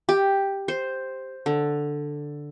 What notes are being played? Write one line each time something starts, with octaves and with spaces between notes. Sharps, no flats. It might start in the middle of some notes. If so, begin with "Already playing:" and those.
G4
C5
D3